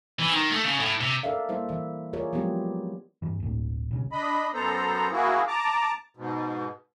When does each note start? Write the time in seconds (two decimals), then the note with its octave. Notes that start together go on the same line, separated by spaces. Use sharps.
0.19 E3
0.32 D#3
0.51 A3
0.64 C#3
0.80 A2
1.01 C3
1.23 A4 A#4 D5 E5 F5
1.49 G3 A#3 E4 C5 E5
1.69 E3 E5
2.13 F4 G#4 A#4 C#5 D5
2.33 F3 F#3 G#3 B3 E4 G4
3.22 G2 E3
3.40 D1 G1 D2 A2
3.91 B1 C#3
4.11 D4 D#5 B5
4.54 F#2 B3 A4 C5 A#5
5.12 A#3 E4 F#4 G#4
5.48 A5 A#5 D6
6.17 G#2 B2